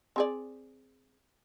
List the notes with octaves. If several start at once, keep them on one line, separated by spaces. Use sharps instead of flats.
C4 G#4 D5